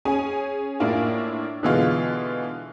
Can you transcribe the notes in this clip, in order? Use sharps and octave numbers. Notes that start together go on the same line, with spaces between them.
C#4 G#4 G#5
A2 A#3 D4 E4 F4
B2 D3 E3 G#3 F4